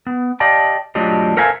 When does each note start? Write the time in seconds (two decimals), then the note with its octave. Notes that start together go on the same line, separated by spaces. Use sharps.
0.07 B3
0.40 G4 D5 D#5 F5 G5 A5
0.95 F#3 A3 D4 F4 G4 D#5
1.37 A4 A#4 C5 E5 F5 G#5